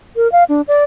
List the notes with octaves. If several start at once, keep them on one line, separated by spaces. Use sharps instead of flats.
A#4
F5
D4
D5